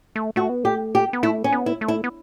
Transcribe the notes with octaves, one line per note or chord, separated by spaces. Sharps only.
A3
A3 F#4
B3
A3 G4
G4
B3
A3 E4
C#4
B3
E4
A3
E4
B3